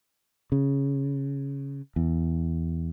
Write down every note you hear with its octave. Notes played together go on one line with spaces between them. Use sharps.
C#3
E2